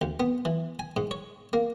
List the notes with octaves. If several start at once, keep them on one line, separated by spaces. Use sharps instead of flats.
D2
B3
E3
G#5
G#2
C#5
A#3